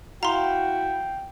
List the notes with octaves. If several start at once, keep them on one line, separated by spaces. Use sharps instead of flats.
E4 F#4 F5 G5 A#5 C6